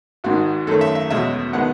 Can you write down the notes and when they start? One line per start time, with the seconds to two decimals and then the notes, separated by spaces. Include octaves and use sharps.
0.24 G#1 G#2 D#3 F#4
0.67 F#2 D#3 A3 C#4 A4
0.81 E5
0.95 E5
1.10 E2 B2 G#3 C#4 E5
1.53 D#3 G#3 B3 F#5